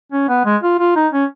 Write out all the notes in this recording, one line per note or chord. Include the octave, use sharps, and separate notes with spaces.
C#4
B3
G#3
F4
F4
D#4
C#4